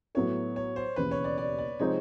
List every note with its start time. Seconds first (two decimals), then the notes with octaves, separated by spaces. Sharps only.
0.15 A2 F#3 B3 E4 A4 C#5
0.56 C#5
0.76 C5
0.96 E1 D#2 C#3 E3 B4
1.11 C#5
1.24 D5
1.38 D5
1.58 D5
1.79 C3 F3 G#3 C4 D#4 C#5